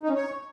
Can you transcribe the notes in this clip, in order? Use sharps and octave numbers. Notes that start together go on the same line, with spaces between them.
D#4
C#4
C#5